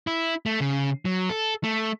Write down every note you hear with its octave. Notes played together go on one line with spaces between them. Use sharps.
E4
A3
C#3
F#3
A4
A3